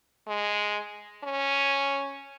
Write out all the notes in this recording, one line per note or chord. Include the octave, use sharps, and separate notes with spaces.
G#3
C#4